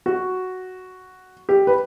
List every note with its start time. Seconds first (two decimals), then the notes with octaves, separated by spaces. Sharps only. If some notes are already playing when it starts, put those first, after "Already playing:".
0.06 F#4
1.49 G4
1.67 B4